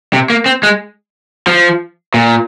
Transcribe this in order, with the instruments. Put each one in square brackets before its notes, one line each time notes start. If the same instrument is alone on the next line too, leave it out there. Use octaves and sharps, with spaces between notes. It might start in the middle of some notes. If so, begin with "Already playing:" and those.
[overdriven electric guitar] C3
A#3
C4
G#3
F3
A#2